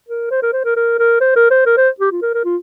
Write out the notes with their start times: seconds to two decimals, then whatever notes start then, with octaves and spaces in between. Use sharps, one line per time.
0.09 A#4
0.31 C5
0.42 A#4
0.53 C5
0.65 A#4
0.76 A#4
0.99 A#4
1.21 C5
1.36 A#4
1.51 C5
1.66 A#4
1.77 C5
2.00 G4
2.12 F4
2.22 A#4
2.34 A#4
2.45 F4